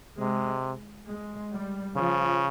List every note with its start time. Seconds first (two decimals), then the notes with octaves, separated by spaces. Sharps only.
0.18 C3 G#3
1.07 G#3
1.52 G3
1.96 C#3 F3